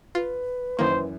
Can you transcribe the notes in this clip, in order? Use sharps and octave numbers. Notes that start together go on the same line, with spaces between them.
F4 B4
F#2 D#3 E3 A#3 C5